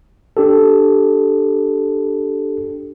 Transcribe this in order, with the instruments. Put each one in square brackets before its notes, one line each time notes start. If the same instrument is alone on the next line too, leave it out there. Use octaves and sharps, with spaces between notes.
[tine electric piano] D4 G4 A4